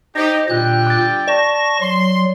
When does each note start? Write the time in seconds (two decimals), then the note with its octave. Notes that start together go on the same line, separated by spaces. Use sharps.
0.16 D#4 G4 C5 D#5
0.50 A#2 D3 G3 G5 F#6
0.87 D6 A6
1.28 D5 A5 C#6 A#6
1.80 F#3 C6